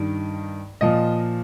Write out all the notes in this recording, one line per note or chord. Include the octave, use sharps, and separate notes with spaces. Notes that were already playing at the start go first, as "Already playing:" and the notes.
Already playing: G2 D#3
A#2 F3 D#5